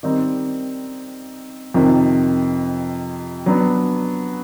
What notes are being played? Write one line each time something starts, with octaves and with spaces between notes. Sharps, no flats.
D#3 G3 C4 D#4
F2 C3 D#3
F#3 B3 D4